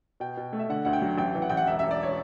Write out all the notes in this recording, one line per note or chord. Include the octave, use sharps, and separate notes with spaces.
B2 G5
B2
A3
E5
D3 F#5
D2 F#5
G5
F#3
A1 G5
E3
F#5
A1 G5
F#5
E1 E5
E1 E5
D5
C#5